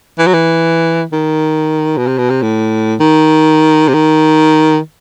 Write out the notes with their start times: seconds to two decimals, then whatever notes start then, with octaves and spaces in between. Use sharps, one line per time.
0.19 E3
0.27 F#3
0.34 E3
1.13 D#3
1.97 B2
2.07 C3
2.18 B2
2.30 C3
2.42 A2
3.00 D#3
3.88 C3
3.94 D#3